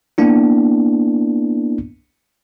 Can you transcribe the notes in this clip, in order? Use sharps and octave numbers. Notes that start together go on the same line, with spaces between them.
A#3 B3 D4 E4